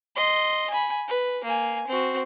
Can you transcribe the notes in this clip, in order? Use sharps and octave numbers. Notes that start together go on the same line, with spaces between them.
D#5 C6
G#5 B5
B4
A#3 G#5
C4 F#4